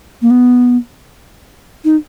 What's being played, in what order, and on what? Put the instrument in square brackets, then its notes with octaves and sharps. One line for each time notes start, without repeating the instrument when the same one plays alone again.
[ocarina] A#3
B3
D#4